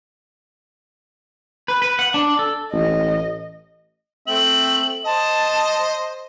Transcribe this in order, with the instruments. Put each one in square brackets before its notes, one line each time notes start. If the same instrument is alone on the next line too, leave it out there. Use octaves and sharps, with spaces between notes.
[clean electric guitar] B4
B4
F#5
D4
A4
[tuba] A1 [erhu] D#5
[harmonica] A3 C4 E5 [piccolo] F#7
[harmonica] C5 D#5 [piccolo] A5